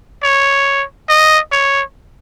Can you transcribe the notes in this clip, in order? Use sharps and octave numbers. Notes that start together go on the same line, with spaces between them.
C#5
D#5
C#5